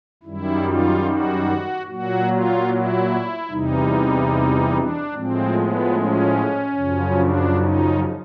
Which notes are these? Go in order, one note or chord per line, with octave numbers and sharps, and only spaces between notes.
F#2 D#3 G3 E4
F4
F#4
A#2 F#3 F#4
F4
E4
E2 C3 E3 G3 D#4
D4
A2 F3 G#3 C4
B3
C#4
F#2 C#3 F3
D4
D#4